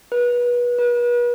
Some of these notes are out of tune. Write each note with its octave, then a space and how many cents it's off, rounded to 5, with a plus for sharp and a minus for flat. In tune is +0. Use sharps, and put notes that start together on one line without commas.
B4 -25
B4 -40